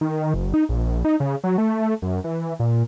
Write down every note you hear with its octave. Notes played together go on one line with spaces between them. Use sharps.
D#3
F#1
D#4
A#1
D#4
C#3
F#3
A3
F#2
E3
A#2